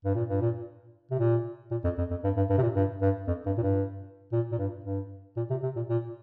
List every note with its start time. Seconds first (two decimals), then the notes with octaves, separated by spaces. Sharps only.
0.05 G2
0.15 A#2
0.29 G2
0.41 A#2
1.11 C3
1.20 A#2
1.71 A#2
1.84 F2
1.98 F2
2.11 F2
2.24 G2
2.37 G2
2.49 G2
2.58 C3
2.62 A#2
2.76 G2
3.01 G2
3.27 F2
3.46 G2
3.58 A#2
3.63 G2
4.32 A#2
4.52 A#2
4.58 G2
4.84 G2
5.37 A#2
5.50 C3
5.63 C3
5.76 A#2
5.89 A#2